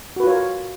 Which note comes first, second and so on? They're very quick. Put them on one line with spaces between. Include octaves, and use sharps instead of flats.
F#4 B4 F4 C#5 A#4